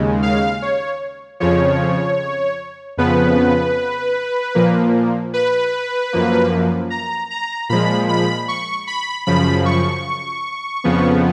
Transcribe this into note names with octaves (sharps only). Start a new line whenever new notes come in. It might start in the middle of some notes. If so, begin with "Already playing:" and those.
Already playing: D#2 C#3 G#3
F5
C#5
F2 C#3 F3 C#5
F2 C#3 F3 B3 B4
A#2 F3 A#3
B4
F#2 F3 A#3
A#5
A#5
A#2 F3 G#3 B5
B5
C#6
B5
F#2 C#3 F3 B5
C#6
F2 C#3 F3 B3